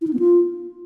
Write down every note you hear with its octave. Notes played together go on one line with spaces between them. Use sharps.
E4
D#4
B3
F4